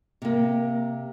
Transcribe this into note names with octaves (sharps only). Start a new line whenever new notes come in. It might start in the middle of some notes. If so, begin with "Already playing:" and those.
C3 A#3